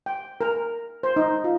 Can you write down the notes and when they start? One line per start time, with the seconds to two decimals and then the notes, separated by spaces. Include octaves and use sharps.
0.06 G5
0.41 A#4
1.03 C5
1.16 D#4
1.44 F4